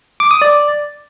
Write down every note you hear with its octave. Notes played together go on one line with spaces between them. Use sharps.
D6
D#6
D5